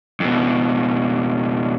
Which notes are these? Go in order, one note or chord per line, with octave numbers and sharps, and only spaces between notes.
F2 B2